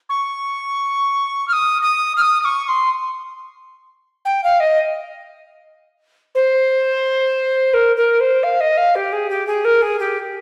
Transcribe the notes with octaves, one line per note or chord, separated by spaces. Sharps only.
C#6
F6
D#6
D#6
F6
D#6
D#6
C#6
C#6
C6
G5
F5
D#5
C5
A#4
A#4
C5
F5
D#5
F5
G4
G#4
G4
G#4
A#4
G#4
G4